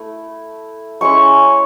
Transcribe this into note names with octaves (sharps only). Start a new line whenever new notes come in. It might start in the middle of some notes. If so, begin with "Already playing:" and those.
Already playing: A3 E4
G#3 C#4 E4 C#6